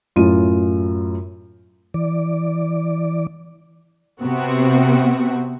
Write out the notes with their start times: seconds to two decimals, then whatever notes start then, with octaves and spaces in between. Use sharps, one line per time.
0.16 F#2 A2 F4 D#7
1.94 E3 D5
4.22 C3 B3 C4 F#4